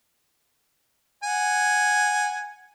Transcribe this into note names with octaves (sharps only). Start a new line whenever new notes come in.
F#5 G#5